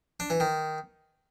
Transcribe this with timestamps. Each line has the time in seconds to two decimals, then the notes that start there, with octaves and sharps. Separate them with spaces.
0.20 D4
0.30 E3
0.40 D#3